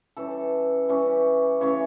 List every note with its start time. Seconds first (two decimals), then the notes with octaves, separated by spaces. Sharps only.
0.17 E3 G3 C#4 A4
0.89 E3 G3 C#4
1.61 C#3 E3 A3 C#4 C#5